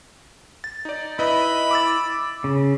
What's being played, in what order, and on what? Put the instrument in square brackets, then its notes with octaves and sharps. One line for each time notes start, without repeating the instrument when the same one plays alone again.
[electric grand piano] A6
D#4 D5
[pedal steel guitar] E4 [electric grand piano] B4 D#5 [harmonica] B5
[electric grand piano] D6 E6 A6
[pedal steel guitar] C#3